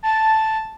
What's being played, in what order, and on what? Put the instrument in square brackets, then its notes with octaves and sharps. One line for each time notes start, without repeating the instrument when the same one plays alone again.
[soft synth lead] A5